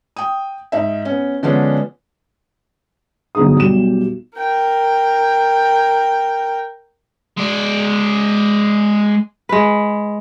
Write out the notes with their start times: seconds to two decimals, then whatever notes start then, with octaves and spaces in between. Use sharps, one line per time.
0.16 G5 D#6
0.72 G#2 D#4 E5
1.05 B3 C#4
1.43 D3 F3 G#3 B3 C#4 D4
3.35 G1 D3 F#3 D#4 G#4 D#6
3.57 B1 G3 G4 E7
4.38 A#4 G5
7.37 G#3 D5
9.49 G#3 B4